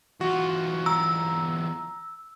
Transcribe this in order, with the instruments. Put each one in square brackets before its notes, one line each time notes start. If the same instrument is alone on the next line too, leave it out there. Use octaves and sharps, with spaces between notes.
[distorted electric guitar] E2 F4 [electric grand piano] F#4
[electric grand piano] A#5 [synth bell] E6